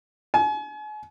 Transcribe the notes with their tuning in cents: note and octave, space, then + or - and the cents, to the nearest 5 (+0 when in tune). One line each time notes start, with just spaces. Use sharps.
G#5 +40